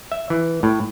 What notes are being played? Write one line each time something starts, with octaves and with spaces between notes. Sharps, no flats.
E5
E3
A2